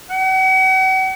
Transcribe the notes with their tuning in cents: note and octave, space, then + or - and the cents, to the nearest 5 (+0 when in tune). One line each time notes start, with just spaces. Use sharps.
F#5 +40